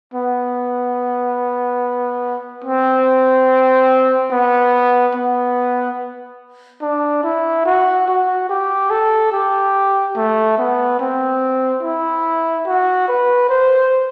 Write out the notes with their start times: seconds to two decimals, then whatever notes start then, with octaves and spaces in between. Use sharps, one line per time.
0.14 B3
2.65 C4
4.31 B3
5.14 B3
6.82 D4
7.24 E4
7.66 F#4
8.08 F#4
8.49 G4
8.90 A4
9.32 G4
10.16 A3
10.58 B3
11.00 C4
11.83 E4
12.67 F#4
13.08 B4
13.49 C5